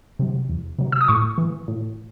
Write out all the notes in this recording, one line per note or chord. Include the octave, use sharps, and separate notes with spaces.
C3 F#3
E2
C3 F#3
E6
D#6
A2 C#6
E3
A2